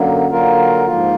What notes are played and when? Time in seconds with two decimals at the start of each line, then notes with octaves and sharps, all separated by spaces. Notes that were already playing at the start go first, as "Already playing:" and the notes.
Already playing: F#2 D3 F#3 A#3
0.30 D3 F#3 A#3 F4 A#4
0.86 G#2 F3 A#3 F4